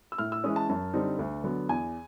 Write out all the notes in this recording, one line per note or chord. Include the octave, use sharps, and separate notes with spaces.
E6
A2 F6
E6
E3 G#3 C#4 D#6
A5
F#2 A5
D3 G3 C4 D#4
D2
D3 F#3 B3
E2 G#5